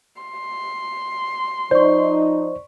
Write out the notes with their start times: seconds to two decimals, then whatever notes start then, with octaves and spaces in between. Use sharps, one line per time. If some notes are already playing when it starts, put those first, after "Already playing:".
0.21 C6
1.71 F3 D#4 C5 D5 C#6